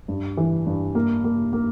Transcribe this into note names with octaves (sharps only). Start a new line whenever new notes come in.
G2
E3
G2
A#3
A#3
A#3